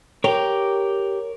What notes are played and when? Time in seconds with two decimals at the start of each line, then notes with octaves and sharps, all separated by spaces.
0.24 G4 A#4 C#5